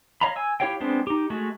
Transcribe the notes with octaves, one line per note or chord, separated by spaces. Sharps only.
C#5 D#5 F5 A#5 B5
G#5 E6
E4 G4 C#5 F5 G5
G#3 B3 C4 D4 C5
D#4 G4
G#3 A3 F#4